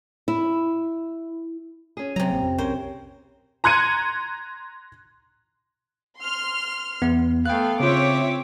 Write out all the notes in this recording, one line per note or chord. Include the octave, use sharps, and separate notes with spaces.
E4
C#4 G#4
C3 F#3 A#5
A1 A#3
F2
B1 C#4 G#4 A#4 C5
A#5 C6 F#6 G#6 C#7 D#7
C6 F6
E2 B3
A3 B3 A4 F5 G5 F#6
C#3 C4 F4 C#5 E5 D6